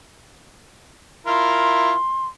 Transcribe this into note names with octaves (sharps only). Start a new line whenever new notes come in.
E4 F4 A#4 C6